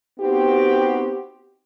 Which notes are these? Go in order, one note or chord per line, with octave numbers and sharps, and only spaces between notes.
B3 C4 D#4 F#4 G4